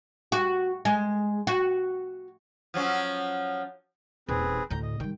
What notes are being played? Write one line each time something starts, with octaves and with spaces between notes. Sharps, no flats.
F#4
G#3
F#4
F3 F#3 C#4
D#1 C4 G#4 B4
D2 A2 A#5 G6
D#5
D#3 G3 G5